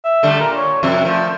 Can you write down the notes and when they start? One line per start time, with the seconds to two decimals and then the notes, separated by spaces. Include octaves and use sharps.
0.04 E5
0.23 D3 G3 A3
0.39 A#2 A#4
0.57 C#5
0.83 F2 C3 G3 E5
1.05 F3 A3